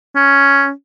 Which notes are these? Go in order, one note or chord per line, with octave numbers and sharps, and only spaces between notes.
C#4